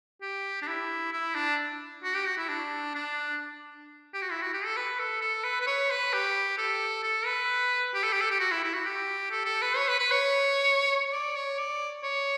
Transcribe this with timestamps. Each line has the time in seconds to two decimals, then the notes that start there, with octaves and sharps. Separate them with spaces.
0.22 G4
0.62 D4
0.68 E4
1.13 E4
1.35 D4
2.03 F#4
2.15 G4
2.26 F#4
2.37 E4
2.49 D4
2.95 D4
4.14 G4
4.22 F#4
4.31 E4
4.42 F#4
4.53 G4
4.65 A4
4.77 B4
4.99 A4
5.21 A4
5.44 B4
5.61 B4
5.67 C#5
5.90 B4
6.13 G4
6.58 A4
7.03 A4
7.26 B4
7.94 G4
8.03 A4
8.13 G4
8.21 A4
8.31 G4
8.40 F#4
8.51 E4
8.63 E4
8.74 F#4
8.86 G4
9.31 A4
9.46 A4
9.62 B4
9.77 C#5
9.88 B4
9.99 B4
10.11 C#5
11.13 D5
11.36 C#5
11.59 D5
12.04 C#5